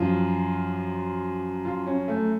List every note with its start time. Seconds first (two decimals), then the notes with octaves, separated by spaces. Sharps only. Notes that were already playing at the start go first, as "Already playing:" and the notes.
Already playing: F#2 F3 F4
1.65 F4
1.86 C#4
2.08 A3